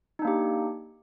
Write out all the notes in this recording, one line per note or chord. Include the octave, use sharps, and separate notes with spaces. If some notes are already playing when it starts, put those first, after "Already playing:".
A#3 D4 D#4 G4